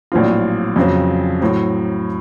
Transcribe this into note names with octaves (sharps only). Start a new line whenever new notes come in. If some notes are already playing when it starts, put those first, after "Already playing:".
A#1 A2 F#3 C4 F4
F2 C#3 F#3 C4
A2 F#3 C4